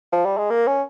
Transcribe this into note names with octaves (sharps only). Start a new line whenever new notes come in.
F3
G3
G#3
A#3
C#4